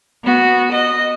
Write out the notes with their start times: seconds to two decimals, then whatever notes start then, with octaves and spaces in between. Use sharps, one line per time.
0.24 B3 F#4
0.72 D#5